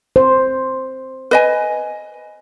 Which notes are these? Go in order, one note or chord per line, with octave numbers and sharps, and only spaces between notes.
C5
B4 D#5 G#5